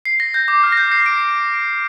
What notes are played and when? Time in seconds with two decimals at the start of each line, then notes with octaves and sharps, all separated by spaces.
0.05 C7
0.20 A#6
0.34 G6
0.48 D6
0.63 F6
0.72 A#6
0.77 G6
0.92 C7
1.06 D7